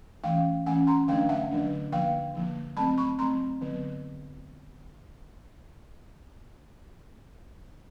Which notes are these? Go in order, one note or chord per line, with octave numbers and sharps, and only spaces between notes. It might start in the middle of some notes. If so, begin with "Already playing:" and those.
E3 A3 C#4 F5 G5
E3 A3 C#4 F#5 G#5
A#5 C6
D3 F#3 A3 D4 F5 G5
E5 F#5
D3 F#3 A3 D4
D3 F3 A#3 F5 G5
D3 F3 A#3
F#3 A3 C4 A5 B5
B5 C#6
F#3 A3 C4 A#5 C6
D3 F#3 B3